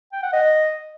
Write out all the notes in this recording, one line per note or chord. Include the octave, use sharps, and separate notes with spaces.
G5
F#5
D#5